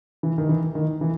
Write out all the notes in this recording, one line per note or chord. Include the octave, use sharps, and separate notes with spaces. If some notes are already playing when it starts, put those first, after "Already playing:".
E3
D#3
E3
D#3
E3